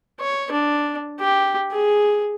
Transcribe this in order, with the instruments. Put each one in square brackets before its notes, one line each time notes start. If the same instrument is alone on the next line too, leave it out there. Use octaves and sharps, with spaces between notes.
[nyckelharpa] C#5
D4
G4
G#4